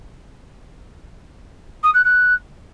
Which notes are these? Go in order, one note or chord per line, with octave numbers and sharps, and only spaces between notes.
D#6
F#6
F#6